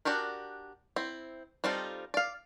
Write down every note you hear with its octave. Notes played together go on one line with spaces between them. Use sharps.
D4 F#4 G4 A#4
C4 E4
G3 C4 D#4 F4 A4
D5 F5